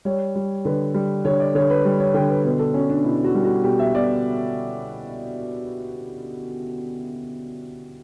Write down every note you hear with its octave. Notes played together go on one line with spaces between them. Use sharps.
G3 C#5
G3
D3 B4
G3
D3 C#5
D5
D3 C#5
B4
G3
C#5
D3 G5
B4
B2 B4
A4
B2 C#4
D4
B2 E4
F#4
G3
F#4
B2 G4
E5
B2 D5